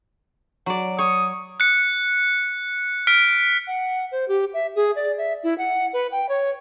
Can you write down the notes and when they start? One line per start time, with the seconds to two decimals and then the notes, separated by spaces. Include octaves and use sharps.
0.66 F#3 D5
0.99 C#5 D#6
1.60 F#6 C#7
3.07 F6 B6 D7
3.67 F#5
4.11 C5
4.28 G4
4.54 E5
4.76 G#4
4.96 D5
5.18 E5
5.43 E4
5.58 F#5
5.93 B4
6.12 G5
6.29 C#5